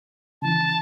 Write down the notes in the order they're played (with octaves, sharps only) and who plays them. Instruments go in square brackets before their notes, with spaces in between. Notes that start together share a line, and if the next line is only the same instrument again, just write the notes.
[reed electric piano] C#3 E3 [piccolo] A5